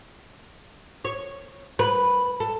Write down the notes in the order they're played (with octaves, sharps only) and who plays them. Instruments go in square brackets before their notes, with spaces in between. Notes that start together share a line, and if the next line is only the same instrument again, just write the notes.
[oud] C#5
B4
A4